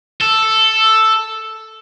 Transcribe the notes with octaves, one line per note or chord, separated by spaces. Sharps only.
A4